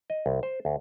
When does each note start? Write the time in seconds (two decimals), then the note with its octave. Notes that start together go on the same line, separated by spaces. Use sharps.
0.10 D#5
0.26 C2
0.43 C5
0.65 D2